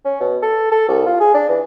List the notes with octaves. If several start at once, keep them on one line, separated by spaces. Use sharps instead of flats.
C#4
B2
A4
A4
C2
F4
G#4
D4
E3